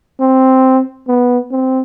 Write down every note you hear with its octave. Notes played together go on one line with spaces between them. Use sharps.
C4
B3
C4